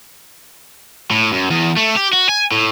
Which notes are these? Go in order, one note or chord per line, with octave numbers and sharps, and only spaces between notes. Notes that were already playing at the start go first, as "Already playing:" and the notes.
A2
F#2
E2
A3
G4
F#4
G#5
A2